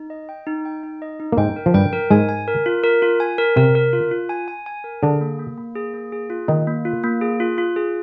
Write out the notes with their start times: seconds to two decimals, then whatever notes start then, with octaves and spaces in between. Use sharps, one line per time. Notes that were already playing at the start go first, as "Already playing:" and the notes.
Already playing: D#4
0.10 D#5
0.29 G5
0.47 D#4
0.65 G5
0.83 D#4
1.02 D#5
1.20 D#4
1.32 A#3
1.37 G#2 G#3 G5
1.56 A#4
1.66 F3
1.74 G2 G3 G5
1.93 A#4
2.10 G#2 G#3 G#5
2.29 G#5
2.48 A#4
2.66 F4
2.83 A#4
3.02 F4
3.20 G#5
3.38 A#4
3.56 C3 C4 A#4
3.75 A#4
3.93 F4
4.11 F4
4.29 G#5
4.48 G#5
4.66 G#5
4.84 A#4
5.02 D3 D4 G#4
5.21 A#3
5.39 A#3
5.57 A#3
5.75 G#4
5.94 A#3
6.12 G#4
6.30 F4
6.48 D#3 A#3 D#4
6.67 A#3
6.85 F4
7.04 A#3
7.21 G#4
7.40 F4
7.58 F4
7.76 G#4